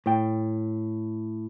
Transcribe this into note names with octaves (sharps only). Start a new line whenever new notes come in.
A2 G5